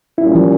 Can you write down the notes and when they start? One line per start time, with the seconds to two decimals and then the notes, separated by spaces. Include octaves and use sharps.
0.18 A#2 G3 A#3 C#4 E4
0.35 F3